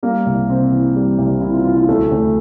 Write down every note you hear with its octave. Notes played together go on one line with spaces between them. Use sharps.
G3 A#3
C2
C3 C4
E3
G3
C2
C3 E4
F4
E3 F4
F4
D2 A3
D2